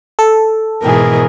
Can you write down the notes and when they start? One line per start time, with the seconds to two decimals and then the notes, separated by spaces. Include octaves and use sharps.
0.19 A4
0.83 G#2 B2 E3 G#4 A#4